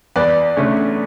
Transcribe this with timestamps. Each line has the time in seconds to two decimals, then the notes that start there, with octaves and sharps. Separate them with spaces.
0.16 E2 B4 D5
0.57 D3 A3 C#4